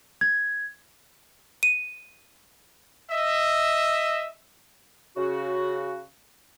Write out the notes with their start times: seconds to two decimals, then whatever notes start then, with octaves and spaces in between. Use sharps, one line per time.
0.21 G#6
1.63 D#7
3.10 D#5 E5
5.16 C#3 F#4